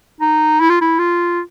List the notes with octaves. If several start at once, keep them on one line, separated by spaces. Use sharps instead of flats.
D#4
E4
F4
E4
F4